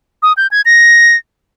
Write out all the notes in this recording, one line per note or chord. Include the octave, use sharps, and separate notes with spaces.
D#6
G6
G#6
A#6